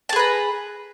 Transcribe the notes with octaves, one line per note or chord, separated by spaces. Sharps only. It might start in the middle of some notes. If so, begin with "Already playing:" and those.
G#4 B4 A5 A#5